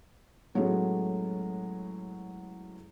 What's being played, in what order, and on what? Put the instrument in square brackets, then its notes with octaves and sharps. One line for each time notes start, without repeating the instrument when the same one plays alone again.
[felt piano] A2 F#3 G#3 A3 B3 C#4